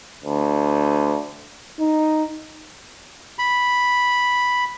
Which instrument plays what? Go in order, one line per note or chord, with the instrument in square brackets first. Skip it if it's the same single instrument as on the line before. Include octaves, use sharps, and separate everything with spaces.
[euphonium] D2
D#4
[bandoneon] B5